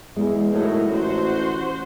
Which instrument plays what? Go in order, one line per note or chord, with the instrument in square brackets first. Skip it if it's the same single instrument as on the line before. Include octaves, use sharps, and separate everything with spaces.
[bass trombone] E2 [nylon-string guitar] G#3
[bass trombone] A2 [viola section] F#3 D#4 A#4
[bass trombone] A1 [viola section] F#4 C5